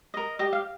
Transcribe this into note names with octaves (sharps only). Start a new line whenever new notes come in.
A#4 D#5
G4 D#5
F5